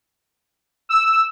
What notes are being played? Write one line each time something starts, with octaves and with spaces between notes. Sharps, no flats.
E6